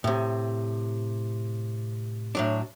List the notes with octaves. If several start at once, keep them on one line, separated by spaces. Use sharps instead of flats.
A2 C3
A2 F#3 D4